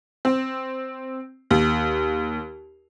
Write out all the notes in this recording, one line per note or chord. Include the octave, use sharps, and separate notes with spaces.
C4
D#2